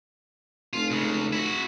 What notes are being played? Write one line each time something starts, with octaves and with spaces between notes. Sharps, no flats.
F1 F4
C#2 C#3
E4 F#4